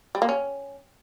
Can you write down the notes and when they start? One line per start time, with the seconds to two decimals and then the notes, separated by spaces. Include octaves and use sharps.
0.15 G3
0.22 A#3
0.29 C#4